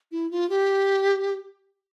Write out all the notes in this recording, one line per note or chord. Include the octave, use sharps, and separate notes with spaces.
E4
F4
G4